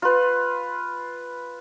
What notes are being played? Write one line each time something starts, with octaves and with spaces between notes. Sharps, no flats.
F4 B4